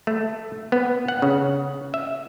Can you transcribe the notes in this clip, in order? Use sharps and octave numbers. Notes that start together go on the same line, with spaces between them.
A3
B3
F#5
C#3
E5